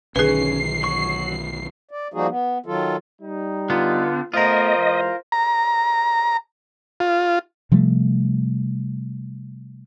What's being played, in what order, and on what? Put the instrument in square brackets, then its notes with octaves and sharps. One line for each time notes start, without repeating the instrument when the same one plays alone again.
[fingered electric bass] B1 D3 D#3 [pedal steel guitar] C#4 [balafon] G#4 B4 [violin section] C7
[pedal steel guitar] F#3 C#6
[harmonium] D5
F3 G3 A#3 D#4 F#4 G#4
B3
D#3 F#3 F4 A4
[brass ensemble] G3 D#4
[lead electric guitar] D3 B3 [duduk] F4
[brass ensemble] A3 B3 [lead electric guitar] F4 A#4 [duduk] C5 [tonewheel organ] D#5
[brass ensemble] E3 G#3
[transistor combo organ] A#5
F4
[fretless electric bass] C3 F3 G3 A3